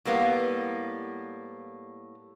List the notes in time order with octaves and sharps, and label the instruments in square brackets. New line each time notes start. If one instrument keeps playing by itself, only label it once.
[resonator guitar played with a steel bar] A2 G3 A#3 B3